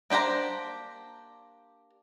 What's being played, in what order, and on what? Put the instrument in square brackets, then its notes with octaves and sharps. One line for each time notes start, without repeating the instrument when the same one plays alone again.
[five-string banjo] A#3 D4 G4 C5 A#5